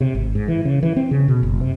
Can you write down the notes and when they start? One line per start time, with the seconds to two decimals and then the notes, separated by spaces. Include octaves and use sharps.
0.01 C3
0.15 G#1
0.35 G#2
0.48 E3
0.65 C#3
0.83 E3
0.96 C4
1.11 C#3
1.28 B2
1.43 F#1
1.61 C3